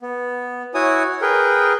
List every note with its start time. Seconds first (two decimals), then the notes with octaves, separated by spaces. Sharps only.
0.01 B3
0.74 E4 F#4 C#5 G#5 D#6
1.22 G#4 A#4 B4 G5